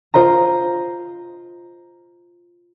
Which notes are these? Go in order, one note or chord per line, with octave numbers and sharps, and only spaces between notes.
F4 C5 D#5 A#5